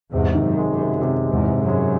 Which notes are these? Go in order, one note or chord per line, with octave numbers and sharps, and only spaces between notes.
E2 G#2 C3
D#3
F#2
G#3
F#2
C3
C3
G#3
E2 G#2
C3
F#2
G#3